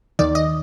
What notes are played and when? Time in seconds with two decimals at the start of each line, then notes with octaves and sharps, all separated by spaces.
0.19 D#2 D#3 D5
0.35 D#5